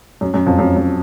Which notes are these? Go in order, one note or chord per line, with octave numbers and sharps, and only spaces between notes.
F#2
F#2
F2
F#2
F#2